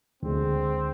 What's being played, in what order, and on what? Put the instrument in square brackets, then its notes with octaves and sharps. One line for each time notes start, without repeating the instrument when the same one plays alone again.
[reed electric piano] D2 [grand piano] D3 G#3 [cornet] C4